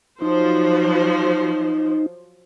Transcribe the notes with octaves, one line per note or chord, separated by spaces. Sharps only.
F3 F#3 D#4 C5